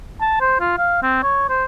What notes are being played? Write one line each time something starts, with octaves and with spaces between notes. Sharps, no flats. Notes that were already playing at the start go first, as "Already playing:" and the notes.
A5
C5
F4
F5
C4
C#5
C5